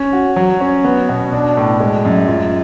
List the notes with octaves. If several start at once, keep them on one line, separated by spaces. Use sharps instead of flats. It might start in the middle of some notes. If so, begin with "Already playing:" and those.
Already playing: C#4
F#4
F#3
C#4
B3
B2
D4
A2
G#3
F#2
F4